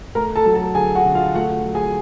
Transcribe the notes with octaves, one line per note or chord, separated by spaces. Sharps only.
A3 A#4 A#5
A4 A5
F#3
A4 A5
D3 G#4 G#5
F#4 F#5
D3
F4 F5
A3 F#4 F#5
F#3
G#4 G#5